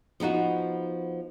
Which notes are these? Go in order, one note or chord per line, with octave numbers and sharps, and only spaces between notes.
F3 B3 D#4 F#4